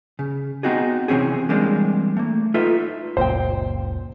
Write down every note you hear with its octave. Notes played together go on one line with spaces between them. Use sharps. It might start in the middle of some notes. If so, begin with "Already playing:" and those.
C#3
B3 C4 D#4 F#4 G#4
C3 E3 C4 C#4 G#4
E3 G3 G#3 A#3 C4 D4
A3 A#3
D#4 F4 A4 B4 E5
F#1 C#2 A#2 C5 G5